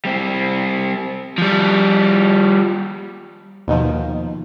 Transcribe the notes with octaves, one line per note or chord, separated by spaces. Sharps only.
G3 C4
F3 G3
D#2 B2 D#3 F3